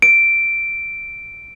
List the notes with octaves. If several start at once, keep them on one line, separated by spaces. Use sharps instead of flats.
D7